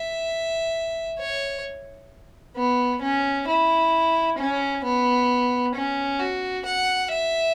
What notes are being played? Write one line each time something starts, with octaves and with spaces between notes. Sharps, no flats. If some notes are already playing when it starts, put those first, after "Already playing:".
Already playing: E5
C#5
B3
C#4
E4
C#4
B3
C#4
F#4
F#5
E5